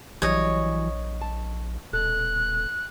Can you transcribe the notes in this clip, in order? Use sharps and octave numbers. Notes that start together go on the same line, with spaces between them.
A#1 E3 F#3 G3 C#5 D#5
A5
D#1 B2 A4 F#6